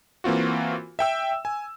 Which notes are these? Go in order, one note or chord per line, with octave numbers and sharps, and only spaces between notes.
E3 A#3 C4 F4 F#4
E5 G5 E6
G#5